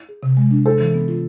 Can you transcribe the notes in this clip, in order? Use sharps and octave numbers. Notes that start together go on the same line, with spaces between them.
G#4
C3
G#3
D4
G#4 A4 C5
E3
B3
F4